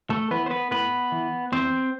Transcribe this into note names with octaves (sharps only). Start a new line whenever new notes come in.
A3 A4
E3 B3 B4
C5
B3 B4
A2 B3 B4
E3
E2 C4 C5